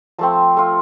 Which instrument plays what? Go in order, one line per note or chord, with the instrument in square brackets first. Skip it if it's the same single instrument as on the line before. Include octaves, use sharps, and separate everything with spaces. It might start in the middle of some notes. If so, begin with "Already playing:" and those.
[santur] F3 A3 C4 A5
A3 F4